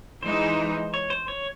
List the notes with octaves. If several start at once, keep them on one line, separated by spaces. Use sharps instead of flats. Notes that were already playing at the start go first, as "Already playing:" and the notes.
E3 G#3 D#4 C5
C#5
C5
C#5